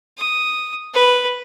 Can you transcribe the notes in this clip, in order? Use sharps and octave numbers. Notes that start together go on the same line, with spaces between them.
D#6
B4